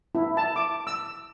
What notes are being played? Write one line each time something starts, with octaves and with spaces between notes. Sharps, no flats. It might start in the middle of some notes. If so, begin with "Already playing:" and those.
E4
A5
D6
E6